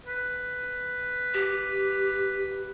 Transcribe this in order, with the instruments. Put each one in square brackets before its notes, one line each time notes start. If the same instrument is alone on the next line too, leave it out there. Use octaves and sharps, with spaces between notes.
[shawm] B4
[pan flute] G4